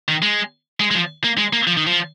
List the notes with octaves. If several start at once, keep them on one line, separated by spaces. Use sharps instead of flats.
D#3
G#3
G#3
G#3
F3
A#3
G#3
A#3
F3
D#3
F3